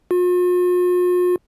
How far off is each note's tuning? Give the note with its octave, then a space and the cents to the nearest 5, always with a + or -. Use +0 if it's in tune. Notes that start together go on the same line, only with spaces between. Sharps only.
F4 +45